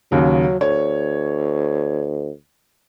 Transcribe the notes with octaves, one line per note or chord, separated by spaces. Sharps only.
D#2 C#3 F#3
D2 C#5